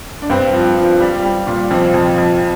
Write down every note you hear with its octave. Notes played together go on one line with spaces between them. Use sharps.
D4
G2 C4
F3
F3
G3
G3
A#2
F2 C4
F2
F2